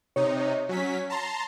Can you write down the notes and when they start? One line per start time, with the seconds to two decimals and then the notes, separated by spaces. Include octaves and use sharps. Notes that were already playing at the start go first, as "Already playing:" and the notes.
0.16 C3 D#4 C#5
0.69 F#3 C#4 B6
1.10 A5 A#5 C6